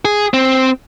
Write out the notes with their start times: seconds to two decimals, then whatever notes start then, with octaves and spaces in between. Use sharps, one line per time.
0.05 G#4
0.34 C4